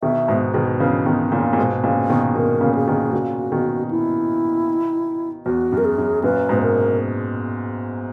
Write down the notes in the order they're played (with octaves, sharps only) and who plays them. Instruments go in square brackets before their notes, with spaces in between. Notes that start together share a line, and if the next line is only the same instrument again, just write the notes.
[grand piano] B2 D#3 [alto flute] E5
[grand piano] G#2 B2
B2 D#3
C#3 E3
B2 D#3
A#2 C#3
A#2
G#2 B2
A#2 C#3
B2 D#3
[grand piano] B2 D#3 [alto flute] A#4
[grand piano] A#2 C#3
[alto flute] G#4
[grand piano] B2 D#3
[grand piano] A#2 C#3 [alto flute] F#4
[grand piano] B2 D#3
[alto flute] E4
[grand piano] E2 [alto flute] F#4
[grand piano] F#2
[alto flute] A#4
G#4
[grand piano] F#2
[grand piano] F#2 A#2 [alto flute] B4
[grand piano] G#2 B2
[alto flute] A#4